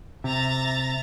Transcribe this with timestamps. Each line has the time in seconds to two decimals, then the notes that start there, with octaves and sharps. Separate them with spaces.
0.24 C3 E5 A#5 A6